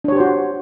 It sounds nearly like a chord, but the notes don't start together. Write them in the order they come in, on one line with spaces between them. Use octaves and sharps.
D4 C#5 G4 C5 F#4